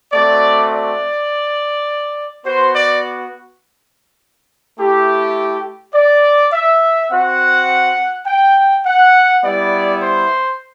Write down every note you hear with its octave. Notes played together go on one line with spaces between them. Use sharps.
A3 C4 F#4 D5
D5
B3 F#4 C5
D5
A3 E4 G4
D5
E5
C4 F#4 F#5
G5
F#5
G3 B3 E4 D5
C5